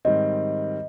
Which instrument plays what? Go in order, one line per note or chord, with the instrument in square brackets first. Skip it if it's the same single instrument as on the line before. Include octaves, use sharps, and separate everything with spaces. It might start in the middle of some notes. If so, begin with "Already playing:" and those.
[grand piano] G#2 D#3 G3 C4 [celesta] D#5